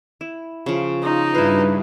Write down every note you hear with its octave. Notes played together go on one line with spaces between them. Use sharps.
E4
C#3 F3
D#4 F4
G2 E4 F4 B4